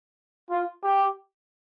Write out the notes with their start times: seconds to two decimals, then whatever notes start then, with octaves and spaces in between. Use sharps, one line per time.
0.50 F4
0.83 G4